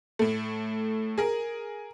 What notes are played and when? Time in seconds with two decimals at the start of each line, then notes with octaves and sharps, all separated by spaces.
0.19 A2 A3
1.18 G#4 A#4